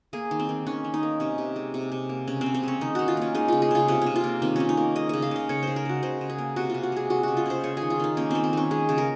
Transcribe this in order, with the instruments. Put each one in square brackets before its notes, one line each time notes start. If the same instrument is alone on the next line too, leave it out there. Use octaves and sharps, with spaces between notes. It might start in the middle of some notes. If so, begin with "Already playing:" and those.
[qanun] A#3 G#4
D#3
C4
D#3
D#3 C#4
D#3
D#4
A#3
C3 C#4
C3
G#3
C3
C3
A#3
C#3 C#4
C#3 C4
C4
G#3 C#4
D#3 D#4
D#3 F#4
F4
A#3 C#4
G#3 D#4
C#3 F4
G#4
C#3 F4
C3 C#4
C3 C#4
F4
A#3
D#3 C4
D#3 C#4
D#4
A#3
G#3 D#5
C#3 D#5
F5
C#3 D#5
C#3 C#5
C#3 C5
A#4
G#3 F#4
C#3 C5
C#3
G#4
A#3
C3 F#4
C3 F4
F#4
G#3 G#4
G#3 F#4
C#3 F#4
F4
C#3 C5
G#3 C#5
D#3 G#4
F4
D#3 D#4
A#3 C#4
D#3 C4
C4
D#3 C#4
G#3 G#4
C#3
A#4